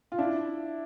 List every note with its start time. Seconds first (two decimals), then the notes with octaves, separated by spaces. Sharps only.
0.12 F4
0.18 D4 E4